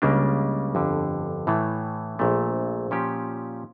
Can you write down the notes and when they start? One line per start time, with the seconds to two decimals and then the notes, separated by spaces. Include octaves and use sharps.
0.02 C#2 C#3 G3 A#3 D4
0.75 G1 F2 D3
1.47 A2 E3 A3
2.19 A#1 A#2 A3
2.91 A#2 F3 C#4 G4